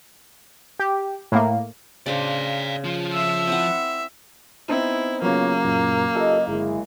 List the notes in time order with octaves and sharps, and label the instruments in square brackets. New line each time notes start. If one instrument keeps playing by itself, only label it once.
[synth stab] G4
A2 A#3
[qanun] C#3 D4 C5 [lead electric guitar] D5 F5
[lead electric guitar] F3 F4
[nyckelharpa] E5
[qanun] C4 E4 F#5
[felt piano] B3 C4 D#4 [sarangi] E4
[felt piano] C#3 F#3 [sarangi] A#3 [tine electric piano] B3 F4 C#5
[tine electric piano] F#2 A#2
[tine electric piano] F4 G4 A4 [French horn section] D#5
[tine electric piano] G1 [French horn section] G#3 E4